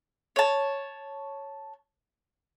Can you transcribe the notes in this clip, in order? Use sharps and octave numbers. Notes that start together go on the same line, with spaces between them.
C#5 A5